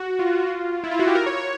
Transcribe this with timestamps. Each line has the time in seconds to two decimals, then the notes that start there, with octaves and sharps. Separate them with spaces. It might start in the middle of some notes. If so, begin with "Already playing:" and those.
Already playing: F#4
0.19 F4
0.84 E4
0.91 F4
0.99 F#4
1.07 G4
1.15 A#4
1.26 C#5
1.37 C#5